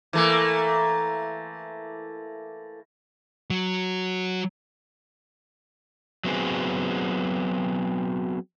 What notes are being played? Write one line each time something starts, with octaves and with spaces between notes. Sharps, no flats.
E3 A3 A#3
F#3
F#3 B3 C4 G#4